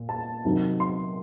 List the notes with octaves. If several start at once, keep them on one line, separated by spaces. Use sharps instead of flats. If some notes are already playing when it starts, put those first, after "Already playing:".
Already playing: A#2
A5
C3 D#3 F#3
C6